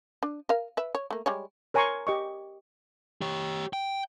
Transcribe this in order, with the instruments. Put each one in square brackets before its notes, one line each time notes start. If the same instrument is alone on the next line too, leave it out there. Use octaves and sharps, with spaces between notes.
[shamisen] D4
A#4 F5
B4 E5
C#5
A3 A#3
G3 G#3 C#5
[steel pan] A#4 C#5 G#5 A#5 C6 C#6
G4 D#5 C#6
[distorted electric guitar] G4 C#5
G5